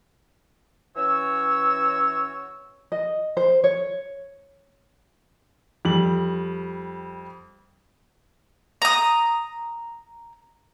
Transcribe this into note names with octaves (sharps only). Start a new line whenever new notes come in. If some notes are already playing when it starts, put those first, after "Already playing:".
E3 C#4 F#4 C#5 E6
D#5
C5
C#5
F2 G3 F#7
A#5 D#6